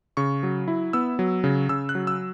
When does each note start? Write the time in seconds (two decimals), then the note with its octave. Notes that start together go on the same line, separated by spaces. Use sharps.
0.17 C#3 C#6
0.43 F#3
0.68 E4
0.93 B3 E6
1.19 F#3
1.44 C#3
1.69 C#3 E6
1.89 F#6
1.95 F#3
2.07 E6